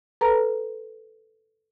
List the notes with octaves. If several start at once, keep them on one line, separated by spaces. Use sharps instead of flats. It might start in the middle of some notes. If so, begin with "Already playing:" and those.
A4 B4 A#5